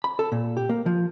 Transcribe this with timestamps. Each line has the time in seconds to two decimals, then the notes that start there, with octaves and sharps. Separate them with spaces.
0.04 B5
0.19 A4
0.32 A#2
0.57 G4
0.69 A#3
0.86 F3